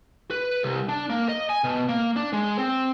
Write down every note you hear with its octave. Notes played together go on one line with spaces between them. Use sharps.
B4
C2
D4
A#3
D#5
G#5
B2
A#3
D4
G#3
C4